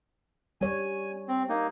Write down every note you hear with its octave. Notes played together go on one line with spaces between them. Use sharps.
G3 C#5 G#5
C4
A#3 D#4